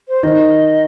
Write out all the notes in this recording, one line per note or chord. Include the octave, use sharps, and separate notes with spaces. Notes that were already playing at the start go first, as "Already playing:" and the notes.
C5
D#3 D#5